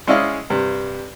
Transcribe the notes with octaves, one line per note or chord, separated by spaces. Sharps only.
G#3 C#4 E4 D5 D#5 F5
G2 C3